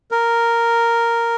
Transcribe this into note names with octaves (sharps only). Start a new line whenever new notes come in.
A#4